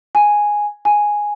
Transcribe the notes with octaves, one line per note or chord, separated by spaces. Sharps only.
G#5
G#5